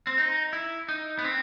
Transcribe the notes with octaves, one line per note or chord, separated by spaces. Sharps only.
C4
D#4
E4
D#4
B3
C4